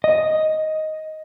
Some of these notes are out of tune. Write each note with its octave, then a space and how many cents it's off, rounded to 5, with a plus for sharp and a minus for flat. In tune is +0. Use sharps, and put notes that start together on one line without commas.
D#5 +5